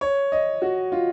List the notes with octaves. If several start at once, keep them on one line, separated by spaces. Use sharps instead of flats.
C#5
D#5
F#4
F4